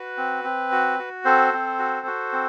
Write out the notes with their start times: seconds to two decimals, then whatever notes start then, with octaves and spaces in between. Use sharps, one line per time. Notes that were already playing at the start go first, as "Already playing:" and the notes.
Already playing: F#4 B4
0.17 C4
0.44 C4
0.72 F#4
0.99 F#4
1.25 C4 A4 C5
1.53 C4
1.79 F#4
2.07 F#4
2.33 C4